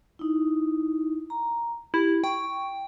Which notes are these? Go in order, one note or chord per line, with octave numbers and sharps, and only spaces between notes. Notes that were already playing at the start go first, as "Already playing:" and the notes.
D#4 E4
A#5
E4 G4
G5 C#6